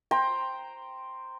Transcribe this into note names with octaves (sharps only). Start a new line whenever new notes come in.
C5 G5 A#5